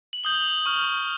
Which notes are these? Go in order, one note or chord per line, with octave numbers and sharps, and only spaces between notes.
F#7
D#6 G6 G7
C#6 F6